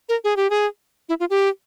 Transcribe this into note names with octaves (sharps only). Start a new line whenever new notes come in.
A#4
G#4
G4
G#4
E4
F4
G4